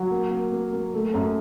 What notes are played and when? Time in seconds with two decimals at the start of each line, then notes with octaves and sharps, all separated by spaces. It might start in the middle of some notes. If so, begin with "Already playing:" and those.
Already playing: F#3
0.11 A#3
0.31 A#3
0.52 A#3
0.72 A#3
0.94 A3
1.14 F#2